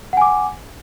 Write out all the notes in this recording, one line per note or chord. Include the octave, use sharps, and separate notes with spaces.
F#5 G#5 D6